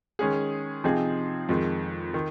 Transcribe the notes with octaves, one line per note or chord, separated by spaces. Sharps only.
D#3 G#3 C#4 G#4
C3 F3 C4 D#4 G#4
F2 D#3 G#3
D#3